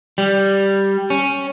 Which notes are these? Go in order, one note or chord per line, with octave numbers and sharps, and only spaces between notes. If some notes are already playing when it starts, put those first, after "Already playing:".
G3
C#4